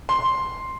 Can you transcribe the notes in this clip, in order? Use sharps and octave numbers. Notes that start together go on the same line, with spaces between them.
C6